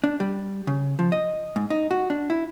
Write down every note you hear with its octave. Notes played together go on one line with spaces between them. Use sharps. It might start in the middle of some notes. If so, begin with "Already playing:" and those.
D4
G3
C#3
F3
D#5
G#2
D#4
F#4
D4
E4